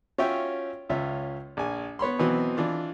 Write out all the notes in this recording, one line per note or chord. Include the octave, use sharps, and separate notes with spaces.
C#4 F4 F#4 C#5 E5 G5
C#2 C#4 F4 E5
A#1 G#5
B3 C#5 B5 C6
B2 E3 F#3 B3 C4
E3 D4 F4